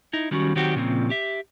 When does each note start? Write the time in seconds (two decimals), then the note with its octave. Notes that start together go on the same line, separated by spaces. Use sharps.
0.13 D#4 E4
0.31 D#3 F#3 G3 C#4 F#4
0.56 D#3 F#3 C4 F#4 G4
0.76 A#2 C#3 F3 A#3 C4
1.10 G4 E5